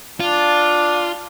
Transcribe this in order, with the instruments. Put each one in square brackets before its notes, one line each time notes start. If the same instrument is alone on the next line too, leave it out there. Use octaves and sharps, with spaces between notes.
[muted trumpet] D4 [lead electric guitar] F4